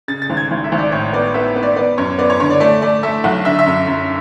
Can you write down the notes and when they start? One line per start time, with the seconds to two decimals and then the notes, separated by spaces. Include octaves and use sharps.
0.08 C#3 A6
0.22 A6
0.30 G#1
0.37 G#6
0.51 G#1
0.64 E5
0.72 G#1
0.78 D5
0.92 A2 C#5
1.13 B3 D5
1.34 B3 E5
1.56 B3
1.63 D5
1.76 B3 D5
1.98 F#2 C#5
2.18 B3 D5
2.30 C#5
2.40 D3 C#5
2.50 D5
2.60 A3 D5
2.82 A3 D5
3.03 A3 E5
3.24 B1 F#5
3.45 D3 E5
3.59 E5
3.66 F#2
3.87 F#2